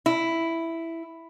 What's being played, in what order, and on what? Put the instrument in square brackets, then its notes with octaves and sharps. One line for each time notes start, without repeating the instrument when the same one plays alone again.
[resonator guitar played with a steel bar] E4